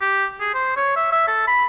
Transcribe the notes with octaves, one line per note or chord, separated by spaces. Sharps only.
G4
G#4
C5
C#5
E5
E5
A4
B5